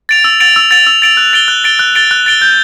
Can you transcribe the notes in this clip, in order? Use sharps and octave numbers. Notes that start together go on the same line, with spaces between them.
A6 D7 F7
E6
A6 D7 F7
E6
A6 D7 F7
E6
A6 D7 F7
F#6
A6 D7 G7
F#6
A6 D7 G7
F#6
A6 D7 G7
F#6
A6 D7 G7
G6